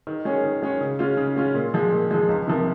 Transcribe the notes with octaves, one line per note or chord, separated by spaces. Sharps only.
D#3
G#3 C#4 G#4 C#5
D#3
G#3 C#4 G#4 C#5
C#3
G#3 C#4 F4
C#3
G#3 C#4 F4
A#2
F3 G#3
A#2
F3 G#3
C#2
C3 F3 A#3